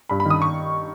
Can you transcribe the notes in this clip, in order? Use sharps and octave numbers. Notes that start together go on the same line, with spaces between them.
G2 B5
B5
D#3
D#6
C#6